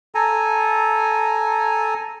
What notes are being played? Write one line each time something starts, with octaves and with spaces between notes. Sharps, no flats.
A4 G#5 A#5